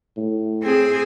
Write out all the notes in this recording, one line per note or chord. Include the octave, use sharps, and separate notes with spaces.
A2
C4 G#4